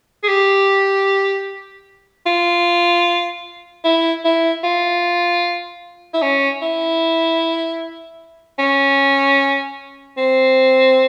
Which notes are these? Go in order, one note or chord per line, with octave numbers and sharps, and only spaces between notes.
G#4
G4
F4
E4
E4
F4
E4
C#4
E4
C#4
C4